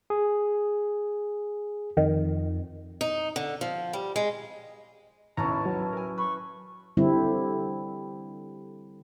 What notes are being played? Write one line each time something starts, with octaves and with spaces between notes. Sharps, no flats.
G#4
F2 D#3
D#4
D3
F3
G3
G#3
A1 D#2 B2 E3 C#4 E4 A5 A#5
F#3
A#4 G#5
B4 B5 C#6
D3 G3 C4 E4